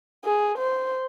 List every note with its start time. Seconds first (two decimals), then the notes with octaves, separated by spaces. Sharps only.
0.24 G#4
0.58 C5